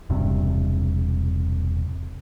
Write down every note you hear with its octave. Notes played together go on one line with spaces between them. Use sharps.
E1 G2 C3